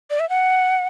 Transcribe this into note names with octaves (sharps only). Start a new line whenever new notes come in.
D5
E5
F#5